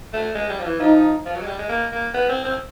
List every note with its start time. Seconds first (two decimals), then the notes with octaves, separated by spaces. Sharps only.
0.14 A3
0.35 G#3
0.50 G3
0.59 F3
0.65 E3
0.80 F3 D#4
1.25 F3
1.36 F#3
1.42 G#3
1.47 G3
1.59 G#3
1.69 A#3
1.92 A#3
2.14 B3
2.29 C4
2.44 C4